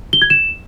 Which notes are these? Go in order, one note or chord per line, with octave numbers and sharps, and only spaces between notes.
G7
G#6
E7